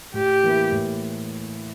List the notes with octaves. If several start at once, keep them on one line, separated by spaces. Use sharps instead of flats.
A2 G4
E3 A#3 E4
A2